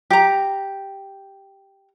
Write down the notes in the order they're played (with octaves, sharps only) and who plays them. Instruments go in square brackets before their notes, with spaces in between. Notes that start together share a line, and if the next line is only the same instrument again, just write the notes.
[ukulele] G4 A#5